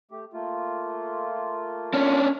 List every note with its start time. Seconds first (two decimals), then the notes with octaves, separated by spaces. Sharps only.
0.11 A3 G4
0.33 A3 A#3 F4
1.94 C#4 D4